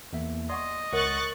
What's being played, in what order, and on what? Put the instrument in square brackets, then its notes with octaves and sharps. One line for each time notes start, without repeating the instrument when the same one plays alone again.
[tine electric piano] E2 A#3 E5
[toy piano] D5 F#5 C#6 [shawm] D#5 [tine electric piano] C6
[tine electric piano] C#2 F#5 [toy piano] A#4 C#5 E5 [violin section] C#6 F#6 A6